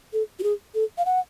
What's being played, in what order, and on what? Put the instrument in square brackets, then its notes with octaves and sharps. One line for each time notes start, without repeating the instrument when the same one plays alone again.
[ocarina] A4
F#4
G#4
A4
F5
F#5